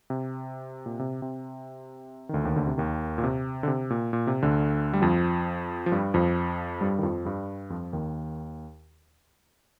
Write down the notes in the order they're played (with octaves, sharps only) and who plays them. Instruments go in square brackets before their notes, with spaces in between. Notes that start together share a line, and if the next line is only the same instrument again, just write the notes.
[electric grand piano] C3
A#2
C3
C3
D#3
D2 D3
D#2 D#3
D2 D3
C3
D#2 D#3
A#2
C3
D3
C3
A#2
A#2
C3
D2 D3
G3
F2 F3
F3
G2 G3
F2 F3
G2 G3
D#3
F2 F3
G2 G3
F2 F3
D#2 D#3